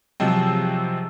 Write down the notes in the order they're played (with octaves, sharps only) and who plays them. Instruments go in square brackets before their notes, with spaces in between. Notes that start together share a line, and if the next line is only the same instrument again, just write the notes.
[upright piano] C3 F3 F#3 G#3 C4